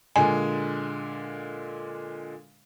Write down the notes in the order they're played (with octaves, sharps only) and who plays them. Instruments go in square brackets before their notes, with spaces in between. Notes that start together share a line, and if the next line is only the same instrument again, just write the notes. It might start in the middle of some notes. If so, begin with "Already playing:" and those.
[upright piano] A#2 D3 G#3 [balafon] G#5